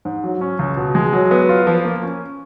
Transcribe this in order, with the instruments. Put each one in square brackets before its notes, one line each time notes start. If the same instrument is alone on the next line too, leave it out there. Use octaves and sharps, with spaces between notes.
[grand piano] G#2
F#3
C#4
C#2
B2
G#3
F#3
B3
F4
F3
A#3
C#4